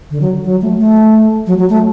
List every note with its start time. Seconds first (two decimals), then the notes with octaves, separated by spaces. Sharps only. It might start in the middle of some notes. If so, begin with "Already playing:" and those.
0.11 D3
0.21 F#3
0.44 F#3
0.61 A3
0.79 A3
1.47 F#3
1.58 F#3
1.70 A3